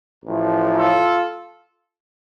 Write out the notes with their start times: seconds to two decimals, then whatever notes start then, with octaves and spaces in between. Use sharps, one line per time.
0.25 A1 A2 F3
0.76 F4 A4